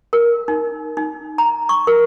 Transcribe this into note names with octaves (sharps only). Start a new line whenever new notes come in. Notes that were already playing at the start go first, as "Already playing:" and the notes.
A#4
D#4
D#4
A#5
C#6
A#4